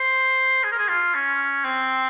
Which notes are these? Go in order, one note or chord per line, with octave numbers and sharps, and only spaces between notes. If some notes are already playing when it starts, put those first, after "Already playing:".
Already playing: C5
G#4
A#4
G#4
F4
C#4
C4